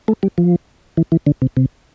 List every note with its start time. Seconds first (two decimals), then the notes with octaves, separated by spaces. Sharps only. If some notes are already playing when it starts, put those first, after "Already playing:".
0.08 A3
0.23 G3
0.38 F3
0.97 E3
1.12 E3
1.27 D3
1.42 C3
1.57 C3